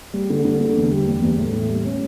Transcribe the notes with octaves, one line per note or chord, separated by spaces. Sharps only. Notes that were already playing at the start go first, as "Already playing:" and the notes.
G3
D3
D3
D3
E2
G3
E2
E2
A2
A2
G3
C#4